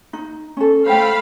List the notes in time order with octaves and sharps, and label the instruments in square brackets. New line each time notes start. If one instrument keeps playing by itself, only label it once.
[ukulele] D#4
C#4 A4
[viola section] A3 F5 B5 [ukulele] C5 G5